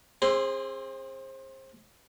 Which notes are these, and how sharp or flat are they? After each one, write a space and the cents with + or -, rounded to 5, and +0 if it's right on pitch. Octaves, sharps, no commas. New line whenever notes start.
C4 +30 G#4 -20 C6 +0